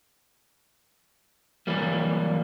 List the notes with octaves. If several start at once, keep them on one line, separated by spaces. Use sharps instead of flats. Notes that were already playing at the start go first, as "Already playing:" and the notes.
E3 F#3 G3 A#3